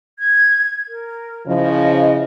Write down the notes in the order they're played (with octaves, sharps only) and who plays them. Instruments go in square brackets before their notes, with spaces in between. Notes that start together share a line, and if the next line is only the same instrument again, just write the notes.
[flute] G#6
A#4
[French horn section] C#3 F3 E4 [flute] D#5